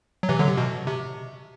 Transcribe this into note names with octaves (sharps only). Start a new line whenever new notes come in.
F#3
C3 E3
D3 F#3
C3
B2
C3